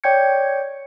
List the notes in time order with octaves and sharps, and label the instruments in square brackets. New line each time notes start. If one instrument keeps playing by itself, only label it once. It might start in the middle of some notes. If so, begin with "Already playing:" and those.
[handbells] C#5 D5 G5 G6 G#6 C#7